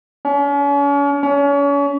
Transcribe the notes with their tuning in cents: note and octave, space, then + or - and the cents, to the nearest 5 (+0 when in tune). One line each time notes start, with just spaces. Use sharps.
C#4 +40
C#4 +35